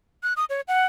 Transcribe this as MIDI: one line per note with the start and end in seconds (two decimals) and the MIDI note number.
0.23 0.33 90
0.37 0.45 87
0.50 0.61 73
0.68 0.86 78